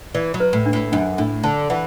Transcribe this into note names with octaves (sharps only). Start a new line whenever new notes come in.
E3 D5
F#3
B4
A2
D4
A2
F#2 D4
A2 D4
D3 A5
E3 F#5